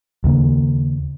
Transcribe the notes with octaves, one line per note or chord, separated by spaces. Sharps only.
D#2 C#3 A#3